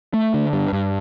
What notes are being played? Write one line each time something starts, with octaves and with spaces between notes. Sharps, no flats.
A3
D3
G2
G2